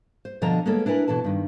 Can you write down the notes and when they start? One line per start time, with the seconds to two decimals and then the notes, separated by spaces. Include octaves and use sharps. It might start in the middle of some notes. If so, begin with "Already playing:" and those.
0.25 C5
0.42 B2 D3 F3 D#5 A5 A#5
0.66 G#3 A#3 B3 C#4 A4
0.86 D4 E4 A#4 B4 G#5 A#5
1.08 B2 E3 A4 A5
1.24 G2 D#3